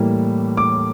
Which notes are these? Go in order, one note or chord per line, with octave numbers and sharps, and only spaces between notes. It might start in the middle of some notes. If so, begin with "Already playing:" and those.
Already playing: A2 E3 G3 A#3
D6